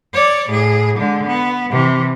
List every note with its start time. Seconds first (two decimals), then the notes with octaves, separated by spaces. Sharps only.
0.13 C#5 D5
0.49 A2 G#4
0.98 D3 G#3
1.27 B3
1.71 C3 E3